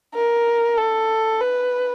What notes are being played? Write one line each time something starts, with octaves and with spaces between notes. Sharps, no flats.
A#4
A4
B4